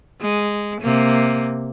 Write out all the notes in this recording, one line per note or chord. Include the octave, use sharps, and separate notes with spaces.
G#3
C3 A#3